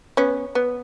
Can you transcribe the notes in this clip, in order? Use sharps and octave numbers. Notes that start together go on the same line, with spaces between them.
B3 C#4
B3